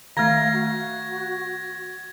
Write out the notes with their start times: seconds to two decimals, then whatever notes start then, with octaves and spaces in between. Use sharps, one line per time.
0.17 D#3 A3 F5 G#6 A#6
0.53 F#4